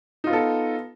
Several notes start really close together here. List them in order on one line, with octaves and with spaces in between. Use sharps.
D#4 F4 B3 A4